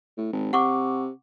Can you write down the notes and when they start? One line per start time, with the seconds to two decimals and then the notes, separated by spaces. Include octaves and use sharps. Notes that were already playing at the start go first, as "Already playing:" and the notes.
0.18 A2
0.33 G#1
0.53 C3 F#5 C#6 D6